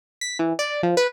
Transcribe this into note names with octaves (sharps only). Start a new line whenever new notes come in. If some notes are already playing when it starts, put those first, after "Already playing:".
B6
E3
D5
F3
B4